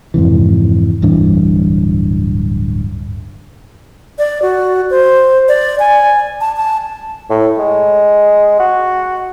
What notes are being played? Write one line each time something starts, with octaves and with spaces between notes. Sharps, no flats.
F2 G#2 C3 E3
D1 G2 E3 D4
D5
F#4
C5
D5
G#5
A5
A5
A2
G#3
F#4